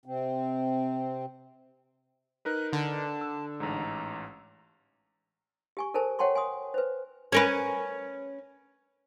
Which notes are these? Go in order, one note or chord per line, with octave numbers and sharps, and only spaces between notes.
C3 C4
D#4 A#4 B4 F#6
D3 A5
E6
A1 G#2 A#5
G4 G#5 C#6
A4 A#4 C5 G#5 A5
C#5 F#5 G5 A5 C6 C#6
G#5 C6 D#6
B4 C5
C#4 A#4 B4